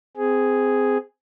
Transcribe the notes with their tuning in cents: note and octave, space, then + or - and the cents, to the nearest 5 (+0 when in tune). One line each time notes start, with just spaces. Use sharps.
C4 -20 G#4 +0